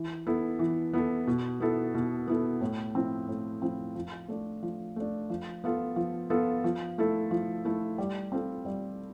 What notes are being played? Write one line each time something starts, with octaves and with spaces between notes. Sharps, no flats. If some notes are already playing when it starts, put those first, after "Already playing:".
Already playing: E3
B3 E4 A4
E3
B3 E4 A4
B2
B3 E4 A4
B2
B3 E4 A4
A2
F3 C4 E4
A2
F3 C4 E4
F3
A3 D4
F3
A3 D4
F3
B3 F4 A4
F3
B3 F4 A4
F3
A3 E4 A4
F3
A3 E4 A4
G3
C4 F4 A4
G3